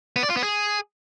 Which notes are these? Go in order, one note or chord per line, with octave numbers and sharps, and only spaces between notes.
B3
D5
F4
B3
G#4